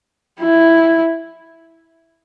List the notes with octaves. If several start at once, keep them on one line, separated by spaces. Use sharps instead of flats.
E4